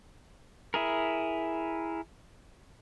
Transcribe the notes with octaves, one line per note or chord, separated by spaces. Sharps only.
E4 G#4 A#4